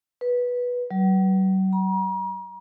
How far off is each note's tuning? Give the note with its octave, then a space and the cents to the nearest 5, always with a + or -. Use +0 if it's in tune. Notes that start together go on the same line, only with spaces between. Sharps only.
B4 -10
F#3 +45
A#5 +40